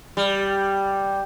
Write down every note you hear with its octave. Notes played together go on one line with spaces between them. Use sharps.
G3